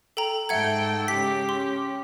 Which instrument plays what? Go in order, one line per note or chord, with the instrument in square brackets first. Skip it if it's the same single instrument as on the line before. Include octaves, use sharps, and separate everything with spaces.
[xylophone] A4 G5 A#5
[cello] G#2 G5 [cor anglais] A4 [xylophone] E5 F#5 G#6
[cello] C#3 G#3 [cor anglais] G4 [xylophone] B6
[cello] C#4 [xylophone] C6